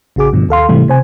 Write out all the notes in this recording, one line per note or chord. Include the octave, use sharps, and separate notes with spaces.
A1 C#3 F#4 G#4 D6
G2 B2 D3 F3
D#2 A4 F5 C6
G#2 C3 E3 G3 A3
C3 C5 G#5